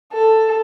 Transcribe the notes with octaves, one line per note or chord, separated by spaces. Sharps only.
A4